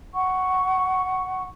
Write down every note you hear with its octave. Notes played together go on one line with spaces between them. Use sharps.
F#5 C#6